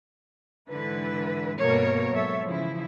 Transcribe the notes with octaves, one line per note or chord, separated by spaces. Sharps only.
G#2 D3 E3 E4 B4
G2 B2 A3 A#3 A#4 C#5
G#2 F#3 A4 C#5 E5
C#3 E3 F3 E4